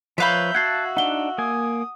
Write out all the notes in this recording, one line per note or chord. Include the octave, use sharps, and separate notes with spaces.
F3 B4 C#5 E5 F5 A#5 B5 G6
F#4 F#5 A5 G#6 C7
D4 D#4 F#5 G7
A#3 G#5 D#6